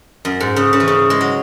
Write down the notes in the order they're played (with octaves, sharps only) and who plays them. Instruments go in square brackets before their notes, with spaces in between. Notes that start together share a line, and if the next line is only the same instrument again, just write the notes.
[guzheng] F#2
G#2
C#3
C#3
E3
C#3
G#3
F#3